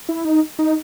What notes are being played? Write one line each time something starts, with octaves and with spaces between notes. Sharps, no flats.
E4
D#4
D#4